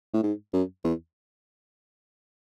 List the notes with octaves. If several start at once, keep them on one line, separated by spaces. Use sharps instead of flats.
A2
G#2
F#2
E2